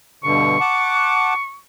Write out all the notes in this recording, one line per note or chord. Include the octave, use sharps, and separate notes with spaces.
G2 B2 D3 C#6
F#5 A5 D6